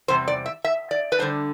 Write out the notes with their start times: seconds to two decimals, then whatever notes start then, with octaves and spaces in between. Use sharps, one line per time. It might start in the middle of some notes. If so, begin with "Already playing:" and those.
0.08 E2 C3 G3 C4 C5
0.28 D5
0.46 E5
0.64 E5
0.91 D5
1.12 B4
1.19 D3 G3 D4 C5